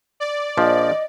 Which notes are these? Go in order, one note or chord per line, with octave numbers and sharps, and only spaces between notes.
D5
A#1 F3 D#5